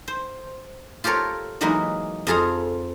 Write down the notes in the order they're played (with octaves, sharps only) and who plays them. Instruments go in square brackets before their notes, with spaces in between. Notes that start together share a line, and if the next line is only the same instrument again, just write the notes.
[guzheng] C5
F4 G4 A4 A#4 C#5
E3 F#3 G#3 A#3 D#4 B4
F2 F4 G#4 A4 F5 A#5